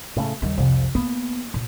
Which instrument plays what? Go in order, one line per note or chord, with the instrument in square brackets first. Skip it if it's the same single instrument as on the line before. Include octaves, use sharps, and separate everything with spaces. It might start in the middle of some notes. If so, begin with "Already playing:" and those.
[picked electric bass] A2 C#3 A3
[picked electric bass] D#2 [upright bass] D#3 G3
[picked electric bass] C2 F2 [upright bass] C3 D#3
[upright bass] A#3 [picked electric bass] B3
[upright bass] A#2